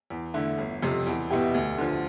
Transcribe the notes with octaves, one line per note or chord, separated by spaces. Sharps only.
E2
D3 A3 E4
G1
F2 C3
E2
B2 B3 E4 G4
D2
D3 F3